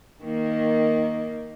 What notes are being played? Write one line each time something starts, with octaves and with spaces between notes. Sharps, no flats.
D#3 A#3